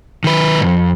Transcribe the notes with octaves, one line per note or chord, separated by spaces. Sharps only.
D#3 B4
B1 F2